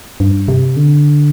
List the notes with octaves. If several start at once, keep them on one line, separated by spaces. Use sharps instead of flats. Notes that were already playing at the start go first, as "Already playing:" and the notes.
G2
C3
D3